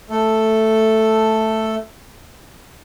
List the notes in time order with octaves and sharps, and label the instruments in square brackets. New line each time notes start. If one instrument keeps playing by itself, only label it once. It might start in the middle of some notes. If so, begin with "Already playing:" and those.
[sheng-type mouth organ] A3 A4